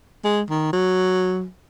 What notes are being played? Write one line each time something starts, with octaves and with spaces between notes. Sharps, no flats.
G#3
D#3
F#3